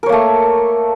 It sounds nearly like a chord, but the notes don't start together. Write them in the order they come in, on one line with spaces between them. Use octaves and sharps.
A#4 C#5 A#3 A3